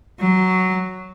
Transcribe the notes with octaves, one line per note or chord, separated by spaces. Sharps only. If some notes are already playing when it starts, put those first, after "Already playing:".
F#3